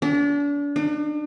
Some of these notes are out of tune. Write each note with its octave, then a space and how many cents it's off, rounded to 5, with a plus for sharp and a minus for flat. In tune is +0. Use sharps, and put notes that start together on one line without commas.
D4 -35
D4 +40